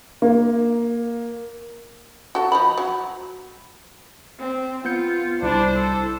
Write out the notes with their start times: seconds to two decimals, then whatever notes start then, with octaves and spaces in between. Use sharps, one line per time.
0.22 A#3
2.35 F#4 A4
2.52 F3 D#5 B5
2.78 F#3
4.39 C4
4.85 B3 F4 G6 C#7
5.42 C2 D4 E4 C5
5.76 A4